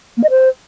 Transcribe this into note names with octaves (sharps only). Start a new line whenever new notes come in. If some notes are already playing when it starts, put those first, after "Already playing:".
A#3
D#5
C5